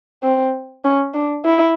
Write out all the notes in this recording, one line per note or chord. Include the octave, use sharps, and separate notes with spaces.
C4
C#4
D4
E4